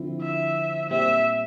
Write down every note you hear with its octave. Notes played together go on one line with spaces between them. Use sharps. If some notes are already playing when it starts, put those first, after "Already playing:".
Already playing: D3 F3 C4 E4
E5
A#2 G3 C4 E5